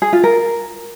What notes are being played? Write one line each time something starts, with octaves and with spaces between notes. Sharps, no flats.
G#4
F4
A#4